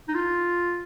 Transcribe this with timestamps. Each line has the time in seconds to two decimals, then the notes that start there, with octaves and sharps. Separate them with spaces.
0.08 D#4
0.14 F4